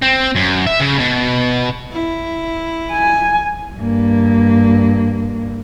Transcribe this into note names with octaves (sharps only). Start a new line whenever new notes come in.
C4
F#2
E5
C#3
B2
E4
G#5
G2 A#3